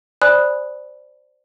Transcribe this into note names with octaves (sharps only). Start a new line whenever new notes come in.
C5 D5 G#5 B5 D#6 F#6